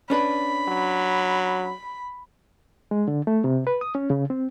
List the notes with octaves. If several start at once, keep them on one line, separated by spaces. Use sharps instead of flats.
C#4 D4 B4 B5
F#3
G#3
D3
A3
C3
B4
D#6
C#4
C#3
C4